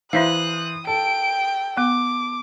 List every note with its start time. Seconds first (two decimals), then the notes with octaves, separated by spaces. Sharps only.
0.13 E3 E4 C5 E5 F5 D#6 F#6
0.87 A4 G5 D7
1.78 B3 D6